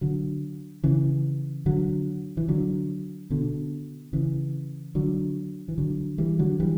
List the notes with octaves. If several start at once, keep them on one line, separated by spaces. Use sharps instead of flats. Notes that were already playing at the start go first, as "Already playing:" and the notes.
D3 F#3
C#3 E3
D3 F#3
E3
D3 F#3
B2 D3
C#3 E3
D3 F#3
E3
D3 F#3
E3 G3
D3 F#3
E3 G3